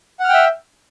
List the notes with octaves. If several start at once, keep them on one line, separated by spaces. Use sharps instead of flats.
E5 F#5 G5 F6